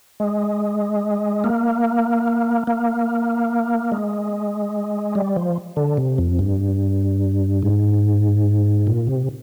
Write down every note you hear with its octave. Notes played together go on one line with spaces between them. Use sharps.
G#3
A#3
A#3
G#3
G3
F3
D3
C3
F2
G2
G#2
A#2
C3